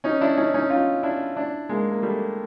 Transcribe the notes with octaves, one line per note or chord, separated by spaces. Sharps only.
C#4 D#4
D4 E4
C#4 D#4
C#4 D#4
D#4 F4
D4 E4
D4 E4
G#3 A#3
A#3
G3 A3